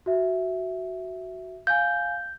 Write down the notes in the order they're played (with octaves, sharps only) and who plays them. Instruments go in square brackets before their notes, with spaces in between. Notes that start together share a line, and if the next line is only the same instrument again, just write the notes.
[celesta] F#4 E5
[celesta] F5 G#5 [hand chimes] G6